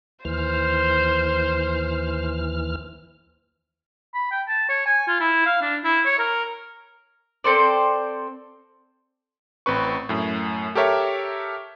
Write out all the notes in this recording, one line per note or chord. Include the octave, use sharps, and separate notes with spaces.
D#2 E3 C5 F6
B5
G5
A5
C#5
G#5
F4
E4
F5
D4
E4
C#5
A#4
C4 A4 C5 D5
A1 C4 B4 C#6
F#2 A2
G4 A4 A#4 C#5 E5